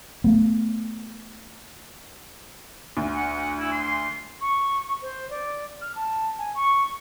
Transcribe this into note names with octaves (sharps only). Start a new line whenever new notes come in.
A3 B3
D2
F#5
E4
C6
C#6
C5
D5
F6
A5
G#5
C#6